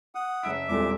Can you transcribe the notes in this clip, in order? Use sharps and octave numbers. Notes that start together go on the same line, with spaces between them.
F#5 D#6
F#1 E5 D7
E1 C2 F2 A#2 A4 D6